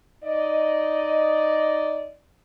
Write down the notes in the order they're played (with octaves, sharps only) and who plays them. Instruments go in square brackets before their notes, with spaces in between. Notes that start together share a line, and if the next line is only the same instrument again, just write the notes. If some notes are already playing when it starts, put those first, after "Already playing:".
[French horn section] D#4 D5 D#5